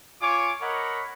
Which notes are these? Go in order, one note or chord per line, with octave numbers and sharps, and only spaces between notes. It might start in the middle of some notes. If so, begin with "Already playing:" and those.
F4 C#5 G#5 D6
A#4 C#5 D#5 F#5 B5